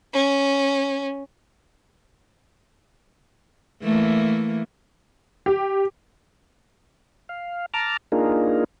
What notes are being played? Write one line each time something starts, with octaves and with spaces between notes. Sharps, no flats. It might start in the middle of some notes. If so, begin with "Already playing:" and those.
C#4
E3 A3 A#3
G4
F5
A5 A#5 D6 F6
A#3 D4 D#4 F4 G#4 A#4